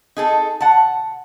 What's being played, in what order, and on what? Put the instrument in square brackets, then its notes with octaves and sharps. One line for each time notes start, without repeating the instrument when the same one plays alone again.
[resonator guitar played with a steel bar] D#4 G#4 A4
F#5 A5